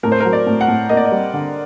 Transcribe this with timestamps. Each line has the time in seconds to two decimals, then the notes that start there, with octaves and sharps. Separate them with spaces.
0.03 A2 A#4
0.12 C5
0.20 F#3 A#4
0.33 D5
0.47 A2
0.61 F#5
0.68 A2
0.89 A#3 D#5
0.97 D5
1.05 D#5
1.12 G3
1.33 D3